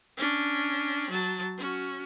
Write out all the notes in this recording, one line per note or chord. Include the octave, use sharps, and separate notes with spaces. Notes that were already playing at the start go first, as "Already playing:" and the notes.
C#4 D4
F#3 A5
C#4 F#4